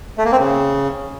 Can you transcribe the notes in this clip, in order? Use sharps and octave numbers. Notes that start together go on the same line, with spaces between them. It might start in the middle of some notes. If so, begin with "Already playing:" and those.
A3
A#3
C4
C#3